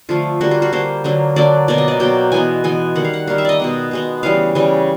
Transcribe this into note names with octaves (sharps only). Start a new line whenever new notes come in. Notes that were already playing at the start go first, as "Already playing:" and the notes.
D3 F3 A3 F4
D3 G3 A#3 F#4
F4
F#4
D3 G3 A#3 C5
D3 F#3 A#3
D3 F#3 A#3 D5
B2 F#3 A#3 D5
D#5
D5
B2 F#3 A#3 G5
E3 G#3 B3 G#5
E3 G#3 B3 G#5
D#3 G3 A#3 F#5
F5
F#5
D#3 G3 A#3 F5
E5
D5 D#5
B2 G#3 B3
B2 G#3 B3
C#3 E3 G3 F5
C#3 E3 G3